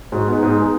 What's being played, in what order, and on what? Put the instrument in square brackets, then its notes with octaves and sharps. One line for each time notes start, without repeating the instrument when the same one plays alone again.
[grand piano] G#2 [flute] F#4
[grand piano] G#3 B3 [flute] D#4
[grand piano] G#2
G#3 B3